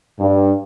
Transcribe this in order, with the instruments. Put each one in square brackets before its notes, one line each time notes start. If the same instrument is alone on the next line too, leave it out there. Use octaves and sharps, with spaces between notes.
[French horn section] G2